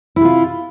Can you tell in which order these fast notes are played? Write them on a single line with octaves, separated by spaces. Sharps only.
E4 C3 F4